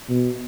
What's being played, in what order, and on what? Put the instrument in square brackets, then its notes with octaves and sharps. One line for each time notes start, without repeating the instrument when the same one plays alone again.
[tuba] B2